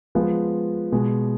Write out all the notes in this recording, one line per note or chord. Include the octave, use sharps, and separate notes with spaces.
F3 G#3 B3
B2 G#3